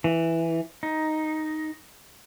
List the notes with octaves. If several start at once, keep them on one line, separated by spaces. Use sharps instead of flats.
E3
D#4